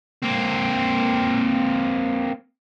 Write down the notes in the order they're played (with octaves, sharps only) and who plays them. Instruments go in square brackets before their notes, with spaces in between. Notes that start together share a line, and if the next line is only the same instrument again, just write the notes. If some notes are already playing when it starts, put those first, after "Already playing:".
[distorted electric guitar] A#3 C4